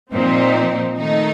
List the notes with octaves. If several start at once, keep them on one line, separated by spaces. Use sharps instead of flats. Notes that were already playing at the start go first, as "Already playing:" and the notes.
A#2 F3 C4 D#4
D#3 A3 D#4